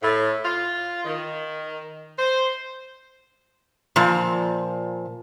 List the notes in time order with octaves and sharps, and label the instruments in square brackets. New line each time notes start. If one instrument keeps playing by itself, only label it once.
[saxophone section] A2
F4
D#3
C5
[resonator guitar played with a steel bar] A#2 F3